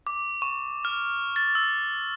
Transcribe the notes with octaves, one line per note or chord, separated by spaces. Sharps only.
D6
C#6
F6
A6
E6